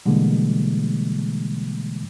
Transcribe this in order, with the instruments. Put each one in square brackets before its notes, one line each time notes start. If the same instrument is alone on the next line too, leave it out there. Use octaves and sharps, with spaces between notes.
[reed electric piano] B2 D3 E3 G3 G#3 A#3